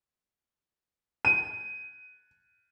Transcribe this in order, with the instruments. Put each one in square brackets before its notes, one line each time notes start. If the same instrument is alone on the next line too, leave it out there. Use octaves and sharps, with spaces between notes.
[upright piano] D#7